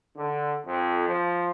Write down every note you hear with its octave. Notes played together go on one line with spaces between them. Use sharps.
D3
F2
F3